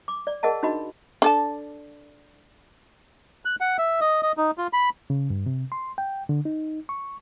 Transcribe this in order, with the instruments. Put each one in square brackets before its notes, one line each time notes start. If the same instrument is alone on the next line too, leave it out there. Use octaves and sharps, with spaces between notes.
[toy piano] D6
D5
G#4 A#4 D#5 F#5 A5
D4 D#4 F#4 D#5 B5
[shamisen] D4 A4 A5
[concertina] F#6
F#5
E5
D#5
D#5
D#4
F4
B5
[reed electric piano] C#3
G2
C3
C6
G5
D3
D#4
C#6